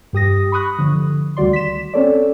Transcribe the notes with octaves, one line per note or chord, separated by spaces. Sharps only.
G2 G4 D#6 A#6
B5 C#6 D#6 F#6
D3 F3
D2 D#3 G3 F#4 D5 C6
B6 E7
C4 C#4 A4 C#5 D5